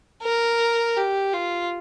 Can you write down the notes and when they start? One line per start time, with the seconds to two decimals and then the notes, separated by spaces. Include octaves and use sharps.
0.22 A#4
0.96 G4
1.33 F4